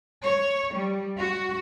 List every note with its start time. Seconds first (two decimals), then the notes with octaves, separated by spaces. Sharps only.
0.24 C#5
0.75 G3
1.19 F#4